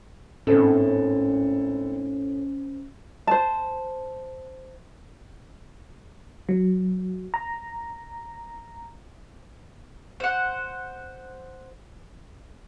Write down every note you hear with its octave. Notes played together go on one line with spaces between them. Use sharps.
G#1 A2 C#4 A4 C5
C5 A5
F#3
A#5
C5 F#5